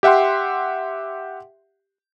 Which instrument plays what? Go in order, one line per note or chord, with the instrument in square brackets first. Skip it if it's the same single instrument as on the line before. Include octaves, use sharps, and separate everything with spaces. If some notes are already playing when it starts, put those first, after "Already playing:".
[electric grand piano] G4 E5 F#5 G5 C6